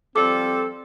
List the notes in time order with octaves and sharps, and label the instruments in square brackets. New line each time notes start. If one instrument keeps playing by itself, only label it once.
[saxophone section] F3 G3 A4 [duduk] C4 [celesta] D6